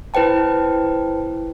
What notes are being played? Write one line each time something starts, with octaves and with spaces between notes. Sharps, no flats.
E4 B4 C5 G5 A5